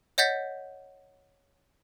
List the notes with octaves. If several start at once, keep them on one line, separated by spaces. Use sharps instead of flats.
C#5 D#5 F#5 G6 A6 B6